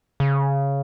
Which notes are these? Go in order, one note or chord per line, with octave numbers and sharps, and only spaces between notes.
C#3